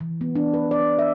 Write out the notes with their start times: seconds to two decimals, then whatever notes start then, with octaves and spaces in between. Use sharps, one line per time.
0.01 E3
0.21 B3
0.36 D4
0.54 B4
0.71 D5
0.99 E5